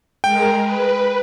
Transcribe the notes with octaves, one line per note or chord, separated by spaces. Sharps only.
G#3 A#4 G5
B4